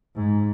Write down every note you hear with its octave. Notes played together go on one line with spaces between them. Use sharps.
G#2